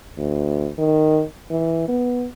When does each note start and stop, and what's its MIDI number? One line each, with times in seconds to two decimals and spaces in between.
0.18 0.69 38
0.78 1.22 51
1.50 1.87 52
1.88 2.27 59